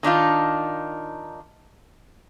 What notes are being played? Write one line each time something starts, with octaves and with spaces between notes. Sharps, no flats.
D#3 D4 D#4 F4